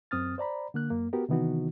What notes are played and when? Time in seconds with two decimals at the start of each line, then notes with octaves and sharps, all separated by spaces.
0.11 F#2 C4 D#6 F6 A6
0.38 C5 D5 A#5 B5
0.74 D3 A#3 F#6
0.90 F#2 A#3
1.13 B3 F#4 G4 A#4
1.29 C3 D#3 E3 B3 D#4 F#4